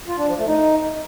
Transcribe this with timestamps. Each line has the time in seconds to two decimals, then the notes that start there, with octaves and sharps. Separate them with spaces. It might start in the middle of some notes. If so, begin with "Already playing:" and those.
0.08 F4
0.18 D4
0.27 F3
0.37 A3
0.47 D#4